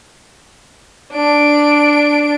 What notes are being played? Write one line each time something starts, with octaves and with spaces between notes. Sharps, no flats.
D4 D7